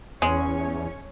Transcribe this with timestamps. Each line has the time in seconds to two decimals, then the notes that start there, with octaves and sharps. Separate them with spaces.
0.22 E2 G#3 C#4 C#5